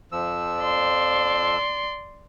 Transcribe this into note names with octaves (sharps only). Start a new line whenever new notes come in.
F2 F3 E6
D5 C6